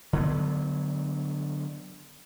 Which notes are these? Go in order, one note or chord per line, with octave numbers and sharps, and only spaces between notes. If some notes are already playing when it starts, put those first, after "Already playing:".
D3 F#3 B3